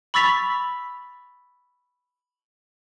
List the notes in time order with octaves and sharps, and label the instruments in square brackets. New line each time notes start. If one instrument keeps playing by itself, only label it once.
[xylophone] B5 C#6 E6 A6 B6 F7